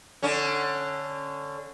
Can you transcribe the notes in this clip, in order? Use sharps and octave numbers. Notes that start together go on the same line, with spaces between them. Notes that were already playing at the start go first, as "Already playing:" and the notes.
D3 C#4